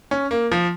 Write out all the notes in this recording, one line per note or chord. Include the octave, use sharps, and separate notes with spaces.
C#4
A#3
F3